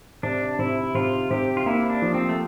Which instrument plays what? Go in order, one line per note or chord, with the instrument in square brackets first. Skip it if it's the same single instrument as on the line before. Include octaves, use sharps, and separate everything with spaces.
[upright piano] C3 [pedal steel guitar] D4
[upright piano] C3 [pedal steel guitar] E4
[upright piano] C3 [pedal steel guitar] F4
[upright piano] C3 [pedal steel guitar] G4
[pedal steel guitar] F4
[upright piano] A#3 [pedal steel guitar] E4
[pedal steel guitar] D4
[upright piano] F3
[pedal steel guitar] C4
A3